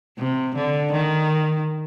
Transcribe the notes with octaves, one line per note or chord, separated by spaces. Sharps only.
C3
D3
D#3